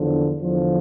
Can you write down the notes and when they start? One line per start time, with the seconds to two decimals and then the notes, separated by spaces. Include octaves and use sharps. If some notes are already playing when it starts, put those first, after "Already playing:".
Already playing: E2 D3 F3
0.40 E2 D3 F3